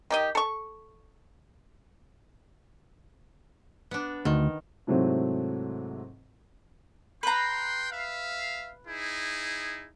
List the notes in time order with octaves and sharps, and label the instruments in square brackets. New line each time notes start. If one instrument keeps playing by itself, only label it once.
[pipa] D#3 G4 D#5
A4 C#6
[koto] B3 D4
[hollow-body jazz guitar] D2 [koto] D#3
[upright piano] G#2 C3 F#3 A3 C4 E4
[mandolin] B4 A#5 [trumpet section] G5 C6
[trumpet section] E5 F5
D#4 E4 G#4